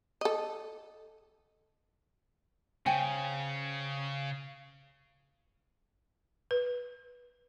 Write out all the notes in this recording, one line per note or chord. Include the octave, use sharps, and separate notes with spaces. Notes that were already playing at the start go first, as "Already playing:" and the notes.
A4 D#5
C#3 C5 G5 G#5
B4